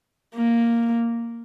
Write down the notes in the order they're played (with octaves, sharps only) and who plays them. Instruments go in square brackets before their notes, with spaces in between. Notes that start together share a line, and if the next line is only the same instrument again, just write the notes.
[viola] A#3